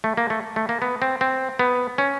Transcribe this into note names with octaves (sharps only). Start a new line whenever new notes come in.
A3
A#3
A3
A3
A#3
B3
C4
C4
B3
C#4